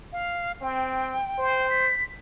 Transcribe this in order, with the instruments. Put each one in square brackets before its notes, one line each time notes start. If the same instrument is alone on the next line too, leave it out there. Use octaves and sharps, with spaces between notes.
[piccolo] F5
[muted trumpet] C4 [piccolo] G5
[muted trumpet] C5
[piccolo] B6